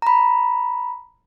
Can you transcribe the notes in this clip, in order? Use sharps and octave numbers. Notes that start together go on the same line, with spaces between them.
A#5 B5